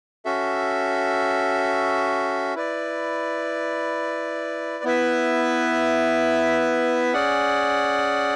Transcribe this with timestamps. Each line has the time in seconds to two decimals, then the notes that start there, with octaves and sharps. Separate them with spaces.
0.25 C#4 F#4 A4 E5
2.55 E4 B4 D5
4.84 B3 E4 B4 E5
7.13 C#4 G#4 D5 F#5